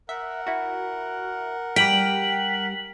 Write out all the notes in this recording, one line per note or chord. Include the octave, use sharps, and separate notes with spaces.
A#4 E5 F#5
E4 F#4
G3 G5 F6 B6 F#7